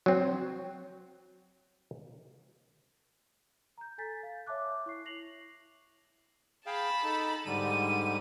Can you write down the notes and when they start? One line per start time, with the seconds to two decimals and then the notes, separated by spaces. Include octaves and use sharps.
0.06 F#3 C4
3.78 A#5 G6
3.98 A4 G#5 G6 A6 B6
4.23 F5
4.47 C#5 E5 A5 D6 F#6
4.86 E4 C#6 C7
5.05 A#6 C7 F7 F#7
6.66 G#4 F5 G5 A5 B5
7.04 D#4 A4
7.46 G#2 D3 G3 D#7